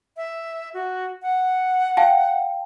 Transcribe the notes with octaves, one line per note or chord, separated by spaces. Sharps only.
E5
F#4
F#5
F5 G5 A5